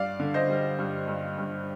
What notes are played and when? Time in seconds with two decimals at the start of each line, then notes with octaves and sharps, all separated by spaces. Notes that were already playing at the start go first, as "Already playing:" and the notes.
Already playing: G2 D5 F5
0.19 D3
0.34 C5 D#5
0.50 G3
0.79 G2
1.08 G2
1.38 G2